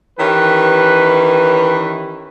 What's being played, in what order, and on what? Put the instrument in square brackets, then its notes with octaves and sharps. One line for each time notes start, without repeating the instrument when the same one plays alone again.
[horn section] D#3 E3 C#4 G4 B4